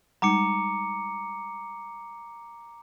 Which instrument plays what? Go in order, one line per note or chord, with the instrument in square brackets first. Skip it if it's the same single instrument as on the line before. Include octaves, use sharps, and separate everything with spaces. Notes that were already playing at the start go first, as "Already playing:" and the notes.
[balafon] G3 G#3 D#4 [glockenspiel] A#5 D6 C#7